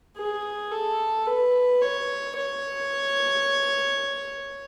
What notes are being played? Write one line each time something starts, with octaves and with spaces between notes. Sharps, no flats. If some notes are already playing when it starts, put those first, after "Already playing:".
G#4
A4
B4
C#5
C#5